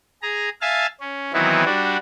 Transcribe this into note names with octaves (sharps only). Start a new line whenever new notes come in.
G#4 A#5
E5 F5 G#5 A5 F6
C#4
D#3 E3 F#3 B3 C4 E4
G3 D4 F#4